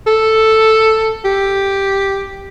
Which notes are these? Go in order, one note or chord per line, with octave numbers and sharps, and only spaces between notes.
A4
G4